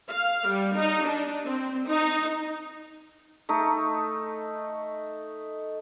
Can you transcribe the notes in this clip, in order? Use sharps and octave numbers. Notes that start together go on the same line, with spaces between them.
F5
G3
D#4
D4
C4
D#4
A3 D#4